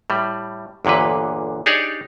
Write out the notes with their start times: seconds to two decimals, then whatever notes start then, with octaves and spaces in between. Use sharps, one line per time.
0.10 A2 G3
0.85 G1 E2 A#2 D3 B4
1.66 D4 D#4 G4 G#4 C#5 D5